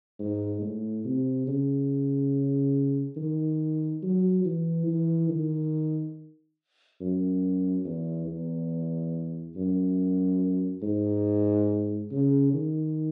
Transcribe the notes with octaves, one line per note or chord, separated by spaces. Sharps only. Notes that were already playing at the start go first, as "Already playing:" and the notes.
G#2
A2
C3
C#3
D#3
F#3
E3
E3
D#3
F#2
E2
E2
F#2
G#2
C#3
D#3